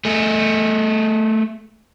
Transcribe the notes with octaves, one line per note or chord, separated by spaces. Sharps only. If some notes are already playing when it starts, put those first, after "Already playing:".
A3 G#4